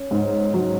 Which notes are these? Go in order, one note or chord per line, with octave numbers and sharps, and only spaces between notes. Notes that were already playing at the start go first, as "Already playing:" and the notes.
Already playing: C#4
G#2
F#3